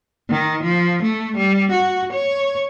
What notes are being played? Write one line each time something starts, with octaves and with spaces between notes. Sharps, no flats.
D#3
F3
A3
G3
F#4
C#5